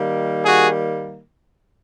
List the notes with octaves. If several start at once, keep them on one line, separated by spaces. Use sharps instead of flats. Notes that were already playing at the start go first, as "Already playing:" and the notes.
Already playing: D#3 G3 A#3
F#4 G#4